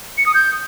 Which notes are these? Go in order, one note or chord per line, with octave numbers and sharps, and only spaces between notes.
C#7
D#6
G6